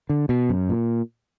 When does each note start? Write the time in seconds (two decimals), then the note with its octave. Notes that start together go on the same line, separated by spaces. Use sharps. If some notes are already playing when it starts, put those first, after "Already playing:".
0.10 D3
0.29 B2
0.49 F#2
0.69 A#2